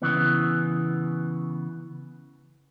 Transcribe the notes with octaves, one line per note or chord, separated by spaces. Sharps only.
C#3 E3 B3